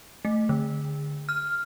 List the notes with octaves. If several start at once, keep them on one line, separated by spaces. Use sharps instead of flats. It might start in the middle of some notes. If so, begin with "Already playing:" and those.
A3
D3
F6